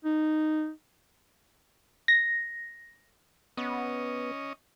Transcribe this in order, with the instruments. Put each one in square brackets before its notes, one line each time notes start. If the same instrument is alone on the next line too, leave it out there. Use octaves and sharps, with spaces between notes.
[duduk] D#4
[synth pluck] A#6
[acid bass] B3 [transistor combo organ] C#4 D#5